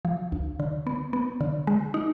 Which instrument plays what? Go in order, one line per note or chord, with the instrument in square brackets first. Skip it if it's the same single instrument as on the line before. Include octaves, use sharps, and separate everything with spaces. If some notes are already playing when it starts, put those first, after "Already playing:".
[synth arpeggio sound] F3
D2
D3
B3
B3
D3
G#3
D#4